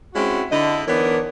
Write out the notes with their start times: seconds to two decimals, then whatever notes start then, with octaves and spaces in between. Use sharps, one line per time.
0.14 G#3 C4 C#4 E4 F#4
0.51 D3 E4 D#5
0.88 E3 B3 D4 D#4 A#4 C#5